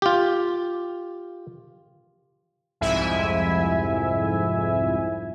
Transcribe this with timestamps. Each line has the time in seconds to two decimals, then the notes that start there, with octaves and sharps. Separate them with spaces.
0.02 F4 G4
2.81 C2 F2 G#2 E4 E5 G#5